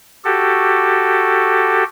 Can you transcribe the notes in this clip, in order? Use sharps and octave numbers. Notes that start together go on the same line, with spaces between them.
F#4 G4 A4